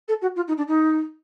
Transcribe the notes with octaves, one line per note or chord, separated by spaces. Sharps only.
A4
F#4
F4
D#4
D4
D#4